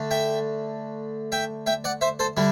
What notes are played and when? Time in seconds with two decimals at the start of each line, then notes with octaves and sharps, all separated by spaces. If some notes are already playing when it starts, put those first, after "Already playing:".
Already playing: D3 A3
0.11 E5 G5
1.32 E5 G5
1.66 E5 G5
1.84 D5 F#5
2.01 C5 E5
2.19 A4 C5
2.37 D3 G3 E4